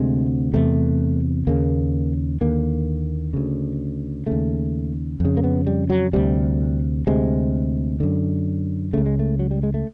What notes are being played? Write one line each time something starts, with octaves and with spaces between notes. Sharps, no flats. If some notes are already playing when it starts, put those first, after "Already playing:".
Already playing: D2 C3 G#3
E2 C3 A3
D#2 C#3 A#3
D#2 D3 A#3
D2 C#3
D#2 C#3 A3
F2 C#3
A#3
B3
G3
F#3
D2 C3 G3
D2 C3 G#3
F#2 D3
C#2 C#3 A3
G#3
A3
F#3
G3
G#3
A3